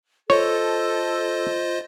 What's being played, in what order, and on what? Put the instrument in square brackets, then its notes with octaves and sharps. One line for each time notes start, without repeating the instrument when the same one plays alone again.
[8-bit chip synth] F4 C5 D#5 [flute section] A4 [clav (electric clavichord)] C#5